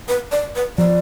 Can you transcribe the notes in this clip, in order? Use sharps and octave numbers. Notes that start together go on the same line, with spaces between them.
B4
D5
B4
F3 D5